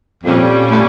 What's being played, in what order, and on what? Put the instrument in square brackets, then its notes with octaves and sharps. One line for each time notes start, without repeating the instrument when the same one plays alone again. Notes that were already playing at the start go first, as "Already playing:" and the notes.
[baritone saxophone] F2 [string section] A#2 G3 C#4
[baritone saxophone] A2